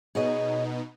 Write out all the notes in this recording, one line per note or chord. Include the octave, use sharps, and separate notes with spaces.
B2 B3 D#4 G#4 C#5 D#5